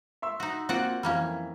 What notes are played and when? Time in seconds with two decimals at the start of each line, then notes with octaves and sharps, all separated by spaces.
0.22 E5 C6 E6
0.40 D#4 F#4
0.69 A#3 C4 F4 F#4 D5 F#5
1.03 F2 E3 G3 A#3 C#4